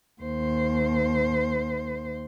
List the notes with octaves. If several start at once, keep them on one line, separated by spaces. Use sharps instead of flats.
D#2 C5